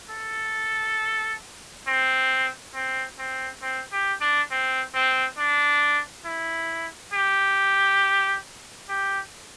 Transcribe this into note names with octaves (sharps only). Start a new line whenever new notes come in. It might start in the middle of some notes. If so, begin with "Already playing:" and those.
A4
C4
C4
C4
C4
G4
D4
C4
C4
D4
E4
G4
G4